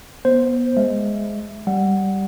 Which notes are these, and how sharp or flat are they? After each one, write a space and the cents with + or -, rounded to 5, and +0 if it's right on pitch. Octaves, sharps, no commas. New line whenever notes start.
B3 -20 C5 +0
G#3 +0 E5 +0
G3 -5 F#5 +0